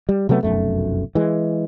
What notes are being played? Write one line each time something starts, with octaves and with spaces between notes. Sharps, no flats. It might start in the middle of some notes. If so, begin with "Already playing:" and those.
G3
C3 F#3 A3 B3
F1 B1 F#2 A3
E3 G#3